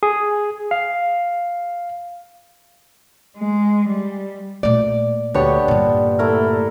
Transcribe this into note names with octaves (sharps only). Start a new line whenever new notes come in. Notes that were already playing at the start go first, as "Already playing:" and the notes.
G#4
F5
G#3
G3
A#2 A3 D5
D2 B3 D4 G4 C#5
G2 A#2 D3
A3 E4 A#4